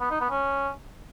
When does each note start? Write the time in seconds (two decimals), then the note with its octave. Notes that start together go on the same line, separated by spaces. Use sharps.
0.01 B3
0.10 D#4
0.20 B3
0.30 C#4